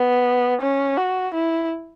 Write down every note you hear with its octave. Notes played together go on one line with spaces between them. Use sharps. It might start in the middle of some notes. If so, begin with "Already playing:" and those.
Already playing: B3
C#4
F#4
E4